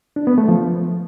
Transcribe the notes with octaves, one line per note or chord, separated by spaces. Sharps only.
D4
B3
A3
F3